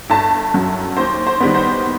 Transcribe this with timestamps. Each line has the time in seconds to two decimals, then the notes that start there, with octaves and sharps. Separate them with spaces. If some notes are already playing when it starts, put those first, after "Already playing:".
0.10 G1 A5
0.54 F#2 F#3
0.97 D#2 C5
1.27 C5
1.40 D#3 G3 B3
1.55 C5